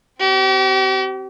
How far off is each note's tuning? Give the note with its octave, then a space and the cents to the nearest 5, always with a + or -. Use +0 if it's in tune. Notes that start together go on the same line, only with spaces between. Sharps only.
C4 +0 G4 -40